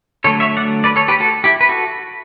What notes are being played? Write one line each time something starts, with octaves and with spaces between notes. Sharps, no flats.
D3 F#3 A3 A4 C#5
C#5 E5
D5 F#5
B4 D5
A4 C#5
G4 B4
F#4 A4
E4 G4
B4
F#4 A4